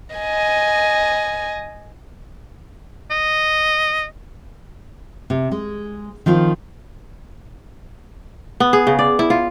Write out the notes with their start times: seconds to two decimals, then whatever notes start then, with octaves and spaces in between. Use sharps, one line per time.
0.16 D#5 G#5
3.11 D#5
5.30 C3
5.52 G#3
6.26 D#3 F3 C4 F4
8.60 B3
8.73 G#4
8.87 C#3
8.99 D5
9.19 E4
9.30 F4